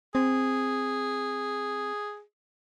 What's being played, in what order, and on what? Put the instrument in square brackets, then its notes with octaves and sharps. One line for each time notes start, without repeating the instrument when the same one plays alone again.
[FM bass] C4 [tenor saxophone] G#4